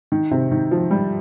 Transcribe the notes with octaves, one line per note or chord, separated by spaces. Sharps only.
D#3
C3
D#3
F3
G3